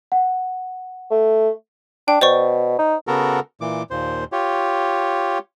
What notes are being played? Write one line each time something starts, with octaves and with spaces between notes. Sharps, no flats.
F#5
A3
D4 G5
B2 C5 D5 C#6
D#4
C#3 B3 F#4 A4 A#4
A#2 E3 D6
D#2 A#2 C5
F4 G4 C#5